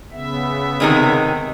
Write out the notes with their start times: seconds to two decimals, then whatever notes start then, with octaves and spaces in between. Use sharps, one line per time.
0.11 C#3 B3 E5
0.80 C3 D#3 G#3